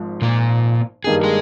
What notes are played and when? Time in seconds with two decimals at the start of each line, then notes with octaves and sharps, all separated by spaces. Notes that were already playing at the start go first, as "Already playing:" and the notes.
Already playing: G#1 G#2 F3
0.22 A#2 A#3
1.04 G2 D#3 A#3 D#4 G4 G#4
1.24 G#3 G#4